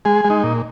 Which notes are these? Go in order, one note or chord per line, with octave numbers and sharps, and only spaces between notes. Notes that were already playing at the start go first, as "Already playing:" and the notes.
G#3 G#4
G#3
D#4
A#2